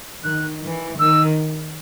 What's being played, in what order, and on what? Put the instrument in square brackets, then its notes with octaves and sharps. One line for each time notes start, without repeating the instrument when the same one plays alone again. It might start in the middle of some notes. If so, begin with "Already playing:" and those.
[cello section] D#3 [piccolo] F#6
[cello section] E3
[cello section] D#3 [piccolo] E6